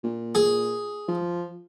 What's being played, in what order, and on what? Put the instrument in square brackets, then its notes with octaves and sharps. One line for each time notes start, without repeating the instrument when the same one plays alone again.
[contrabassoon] A#2
[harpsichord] G#4
[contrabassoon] F3